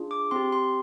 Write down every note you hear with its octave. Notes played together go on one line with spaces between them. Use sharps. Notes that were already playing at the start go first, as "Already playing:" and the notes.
Already playing: D4 F4 G#4
D6
C4 G4 C6
C6